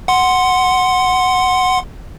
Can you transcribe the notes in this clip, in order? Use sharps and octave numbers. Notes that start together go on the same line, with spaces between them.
F#5 C6